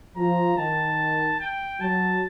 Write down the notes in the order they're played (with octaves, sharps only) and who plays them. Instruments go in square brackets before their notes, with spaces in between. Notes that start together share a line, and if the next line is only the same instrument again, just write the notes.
[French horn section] F3 [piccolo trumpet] A#5
[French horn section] D#3 [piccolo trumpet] A5
[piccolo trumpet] G5
[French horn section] F#3 [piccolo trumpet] A5